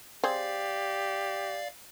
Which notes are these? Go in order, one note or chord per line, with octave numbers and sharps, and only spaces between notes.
C4 G4 G#4 D5 F5